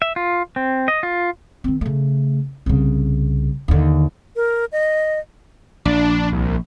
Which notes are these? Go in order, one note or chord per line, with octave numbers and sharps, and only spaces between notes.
E5
F4
C4
D#5
F4
D#3 C4
C#3 A3
C2 C#3
D#2 D3
A#4
D#5
A#1 D4
C2